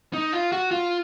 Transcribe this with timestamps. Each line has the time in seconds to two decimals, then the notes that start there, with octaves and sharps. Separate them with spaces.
0.13 D#4
0.32 F4
0.52 F#4
0.71 F4